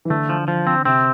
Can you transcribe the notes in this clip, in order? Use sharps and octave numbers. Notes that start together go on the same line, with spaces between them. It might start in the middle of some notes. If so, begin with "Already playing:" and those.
E3
D3 A3
F3
F3
C4
C3 C4